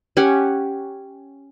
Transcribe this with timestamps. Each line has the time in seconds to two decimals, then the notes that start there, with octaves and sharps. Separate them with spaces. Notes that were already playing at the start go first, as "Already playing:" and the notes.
0.17 C#4 G4 F#5 G#5